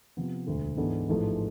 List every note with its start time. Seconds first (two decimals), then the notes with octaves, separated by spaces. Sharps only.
0.17 C3 F3 B3
0.47 E1 D2 D3 A3
0.77 G#2 E3 B3 D4 A4
1.09 A1 G#2 F3 A3